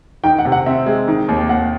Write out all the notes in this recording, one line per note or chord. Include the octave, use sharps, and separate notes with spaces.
D#3 G5
F#5
C3
F#5
C4 E5
G#3
D#3
D#2
D#2 F#5